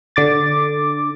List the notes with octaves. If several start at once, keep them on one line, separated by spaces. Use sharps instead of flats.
D3 D6 A6